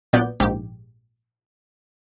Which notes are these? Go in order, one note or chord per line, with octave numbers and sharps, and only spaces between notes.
A#1 A#2 F#3 B3 D5 G6
A#1 G#2 G4